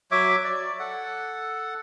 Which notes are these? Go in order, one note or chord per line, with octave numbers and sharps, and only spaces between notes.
F#3 C#5 E5 D6
D5
A4 F#5